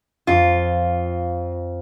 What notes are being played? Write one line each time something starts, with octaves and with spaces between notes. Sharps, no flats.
F2 F4